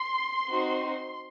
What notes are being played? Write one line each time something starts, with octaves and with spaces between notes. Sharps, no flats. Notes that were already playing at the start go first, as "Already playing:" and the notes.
Already playing: C6
C4 D#4 F#4